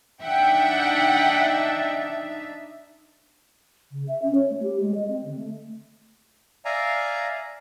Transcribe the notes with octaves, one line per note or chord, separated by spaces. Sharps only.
D4 D#4 E5 F#5 G5
C#3
E5
C#4
C#5
A3
G4
G#3
D#5
C4
D3
A3
D5 E5 F5 G#5 A#5